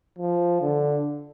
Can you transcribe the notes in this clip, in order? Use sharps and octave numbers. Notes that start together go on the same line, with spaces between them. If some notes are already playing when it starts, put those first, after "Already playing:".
F3
D3